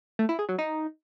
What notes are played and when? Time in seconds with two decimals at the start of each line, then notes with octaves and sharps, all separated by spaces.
0.19 A3
0.29 E4
0.39 G#4
0.49 F#3
0.59 D#4